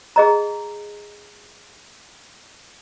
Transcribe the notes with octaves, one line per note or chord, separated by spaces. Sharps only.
G#4 D#5 A#5